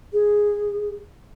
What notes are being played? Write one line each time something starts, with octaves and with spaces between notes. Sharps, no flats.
G#4